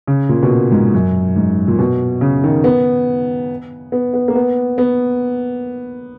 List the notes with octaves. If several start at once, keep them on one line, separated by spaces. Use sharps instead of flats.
C#3
A#2
B2
A#2
G#2
F#2
G#2
A#2
B2
C#3
D#3
B3
B3
B3
A#3
B3
B3